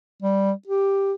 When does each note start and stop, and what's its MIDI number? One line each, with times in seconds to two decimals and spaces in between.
0.22 0.52 55
0.67 1.13 67